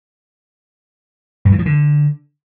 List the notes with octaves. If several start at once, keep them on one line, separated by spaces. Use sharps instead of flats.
G2
E3
F3
D3